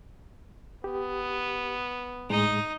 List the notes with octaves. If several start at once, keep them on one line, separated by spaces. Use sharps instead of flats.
B3 G4
A2 G#3 D#4